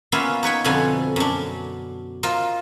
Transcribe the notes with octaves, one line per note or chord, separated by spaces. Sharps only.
A#3 B3 C#4 E4 F4
D#4 B4 C#5 G5
F2 B2 D3 B3 F5 G#5
F#2 D4
F4 A#4 C5 D#5